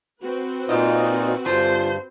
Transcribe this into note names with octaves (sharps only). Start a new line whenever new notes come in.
C4 F#4 B4
A#2 D#4 F4 C5 D#5
G2 D3 F4 C5 C6